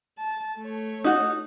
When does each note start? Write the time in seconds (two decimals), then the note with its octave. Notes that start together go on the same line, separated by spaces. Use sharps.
0.18 A5
0.59 A3 C#5
1.04 D#4 F#4